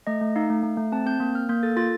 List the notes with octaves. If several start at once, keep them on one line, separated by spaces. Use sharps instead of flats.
A3 D#5
A3
D#4 F5
A3
A3
A3
C4 A5
C4 G6
A#3
A#3 F6
A#3 G6
A4 A6
F4 A6